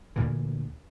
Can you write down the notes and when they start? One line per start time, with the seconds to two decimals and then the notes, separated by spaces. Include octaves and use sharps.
0.16 D2 A#2 D3 E3